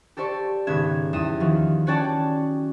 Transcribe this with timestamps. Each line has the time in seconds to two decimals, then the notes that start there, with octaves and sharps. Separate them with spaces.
0.17 G4 A4 C5 D5 C#6
0.67 G#1 C#3 B3 G#6 E7
1.13 E2 G3 D#6 E7
1.40 D#3 F3 F#3
1.86 C#4 F#4 C#5 D5 G5 A5